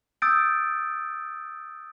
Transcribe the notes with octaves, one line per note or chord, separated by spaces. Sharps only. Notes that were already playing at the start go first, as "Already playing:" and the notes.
D#6 E6 G6 A6 D7